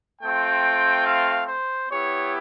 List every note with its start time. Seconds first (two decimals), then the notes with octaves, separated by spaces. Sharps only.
0.22 A3 C4 F4 G5
1.05 F5
1.47 C5
1.89 B3 E4 G4 C#5